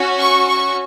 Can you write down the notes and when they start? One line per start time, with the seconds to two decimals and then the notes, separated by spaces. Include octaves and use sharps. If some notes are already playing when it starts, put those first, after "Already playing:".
Already playing: C#4 F#4
0.19 C#6
0.46 C#6